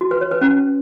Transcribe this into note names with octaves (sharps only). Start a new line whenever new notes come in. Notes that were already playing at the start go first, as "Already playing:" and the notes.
F#4
B4
C#5
B4
C#4